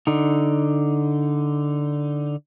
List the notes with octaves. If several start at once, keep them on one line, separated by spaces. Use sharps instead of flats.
D3 D#4